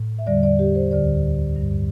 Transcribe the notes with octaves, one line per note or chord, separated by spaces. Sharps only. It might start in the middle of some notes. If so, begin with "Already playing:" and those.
Already playing: A2
E5
E2 D3 G3 D5
D5
G4
C5
D2 D3 G3 D5
G2 G3